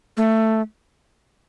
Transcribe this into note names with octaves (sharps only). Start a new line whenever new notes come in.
A3